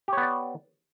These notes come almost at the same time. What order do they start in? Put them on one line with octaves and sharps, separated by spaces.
G4 C#5 B3 D5